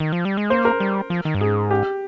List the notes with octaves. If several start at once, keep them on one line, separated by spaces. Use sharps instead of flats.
D#3
F3
G3
G#3
A#3 C5
A#4
G3
F3
D#3
G2
G#2 G#4
G4